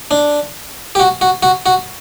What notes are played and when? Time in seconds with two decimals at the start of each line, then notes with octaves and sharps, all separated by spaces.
0.11 D4
0.95 G4
0.99 F#4
1.21 F#4
1.43 F#4
1.66 F#4